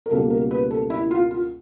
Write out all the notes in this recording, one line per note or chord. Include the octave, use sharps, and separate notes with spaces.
A#4
C#2 B2 G3 A#3 A4
A#4
B4
A4
E4
F4
F4